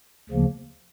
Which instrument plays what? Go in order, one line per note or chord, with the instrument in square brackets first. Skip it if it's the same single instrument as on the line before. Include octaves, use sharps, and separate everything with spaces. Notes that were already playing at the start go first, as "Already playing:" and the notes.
[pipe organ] D2 C#3 F3 A#3